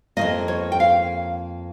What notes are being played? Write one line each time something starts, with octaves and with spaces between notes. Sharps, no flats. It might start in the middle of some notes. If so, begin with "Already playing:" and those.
F2 D#3 A#3 D#5
C#5
G5
F5